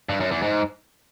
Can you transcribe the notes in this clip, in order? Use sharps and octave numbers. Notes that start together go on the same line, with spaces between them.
G2
F#2
E2
G#2